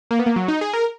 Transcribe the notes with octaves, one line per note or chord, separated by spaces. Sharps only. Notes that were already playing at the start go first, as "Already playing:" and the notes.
A#3
B3
A#3
F#3
D#4
G#4
A#4